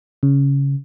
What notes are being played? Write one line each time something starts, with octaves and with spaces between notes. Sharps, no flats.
C#3